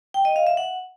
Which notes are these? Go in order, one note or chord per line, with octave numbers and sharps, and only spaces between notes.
G5
D#5
F5
E5
F#5